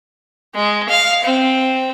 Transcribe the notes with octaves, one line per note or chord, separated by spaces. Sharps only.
G#3
F5
C4